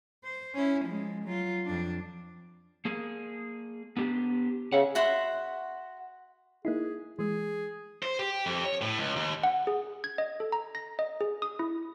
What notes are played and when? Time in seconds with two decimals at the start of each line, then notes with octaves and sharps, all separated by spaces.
0.24 C5
0.55 C#4 E4
0.85 F3 G#3
1.24 F#3 F4
1.65 F2 D4
2.85 A#3 G#4
3.97 B3 D4 G4
4.73 C#3 E5 F#5
4.95 F#4 E5 F#5 C6
6.65 A#3 D#4 E4 G#4
7.19 E3 G#3 G#4
8.03 C5
8.19 G4
8.46 F2
8.64 C#5
8.82 A2
8.98 C#2
9.16 D#2
9.43 F#5
9.67 G#4
10.04 G#6
10.18 D#5
10.40 A4
10.52 A#5
10.75 A#6
10.99 D#5
11.21 G#4
11.42 D#6
11.59 E4